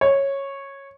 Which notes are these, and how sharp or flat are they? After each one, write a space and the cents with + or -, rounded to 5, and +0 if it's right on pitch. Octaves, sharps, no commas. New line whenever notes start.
C#5 -10